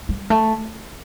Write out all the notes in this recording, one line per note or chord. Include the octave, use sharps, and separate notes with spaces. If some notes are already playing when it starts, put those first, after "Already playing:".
G3
A3